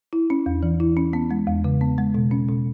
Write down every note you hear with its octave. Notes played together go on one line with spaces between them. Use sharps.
E4
C#4
E2
E3
E4
C#4
B3
G#3
E2
C#3
B3
G#3
B2
C#4
B2